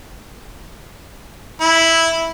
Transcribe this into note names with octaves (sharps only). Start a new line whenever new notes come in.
E4